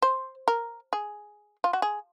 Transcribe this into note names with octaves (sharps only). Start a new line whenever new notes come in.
C5
A#4
G#4
F4
F#4
G#4